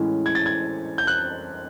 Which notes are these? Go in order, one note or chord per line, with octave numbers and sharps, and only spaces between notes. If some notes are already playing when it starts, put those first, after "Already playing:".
Already playing: A2 E3 G#3 C#4
G#6
A6
G#6
G6
F#6